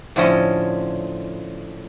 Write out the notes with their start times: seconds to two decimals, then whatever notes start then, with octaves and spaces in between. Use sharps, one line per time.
0.16 A2 D3 F3 C#4 D#5